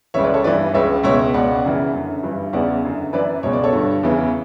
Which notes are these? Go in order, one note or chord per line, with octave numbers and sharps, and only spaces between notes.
C#2 C#3 E3 C#5 E5
B4 D5
A4 C#5
G2 E3 B4 D5
C#2 C#3 E3 C#5 E5
C#2 B2 C#5 E5
C#2 B2 D5 F#5
F#2 C#3 E3
F#2 D3
G2 E3
E2 C#3 E3 D5 F#5
F#2 D3
F#2 E3 B4 D5
C#2 B2 C#5
D5
A4 C#5
G2 D3
E2 C#3 E3